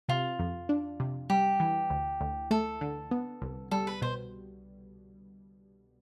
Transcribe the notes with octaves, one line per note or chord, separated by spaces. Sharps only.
C3 F4
F2
D4
C3
G3 G4
E3
D2
D2
A3 A4
D3
B3
C2
G3 A4
B4
B2 C5